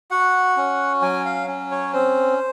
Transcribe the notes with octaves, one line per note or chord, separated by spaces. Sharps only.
F#4 F#5
C#4
F#3 G#5
F5
C#4
C#5
C4 C5